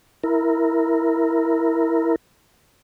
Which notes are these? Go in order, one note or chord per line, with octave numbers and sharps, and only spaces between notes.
E4 A#4